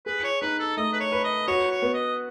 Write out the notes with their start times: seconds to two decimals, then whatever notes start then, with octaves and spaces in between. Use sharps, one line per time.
0.06 G#4 B4
0.24 C#5
0.42 D#4 B4
0.59 A4
0.77 A3 D#5
0.93 B4
1.00 C#5
1.12 B4
1.24 D#5
1.48 F#4 C#5
1.71 C#5
1.82 B3
1.94 D#5